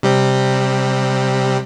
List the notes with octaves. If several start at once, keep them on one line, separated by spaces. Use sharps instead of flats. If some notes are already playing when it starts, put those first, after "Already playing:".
C3 G3 C4